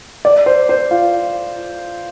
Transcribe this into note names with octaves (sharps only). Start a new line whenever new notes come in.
D5
C5
C5
F4